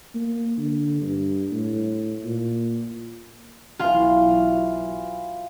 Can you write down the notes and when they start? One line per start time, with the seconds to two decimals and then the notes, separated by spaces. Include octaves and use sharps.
0.15 A#3
0.58 D3
1.01 G2
1.52 A2
2.24 A#2
3.79 B1 E3 F4 F#4 F5